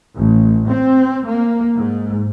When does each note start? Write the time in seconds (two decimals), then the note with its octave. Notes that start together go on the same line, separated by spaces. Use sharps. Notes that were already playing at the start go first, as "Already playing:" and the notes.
0.15 A1
0.68 C4
1.26 A#3
1.76 G#2